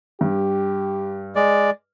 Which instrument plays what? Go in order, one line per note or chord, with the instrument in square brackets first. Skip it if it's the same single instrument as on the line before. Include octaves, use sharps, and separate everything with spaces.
[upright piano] G2 [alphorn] G4
[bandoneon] G#3 D5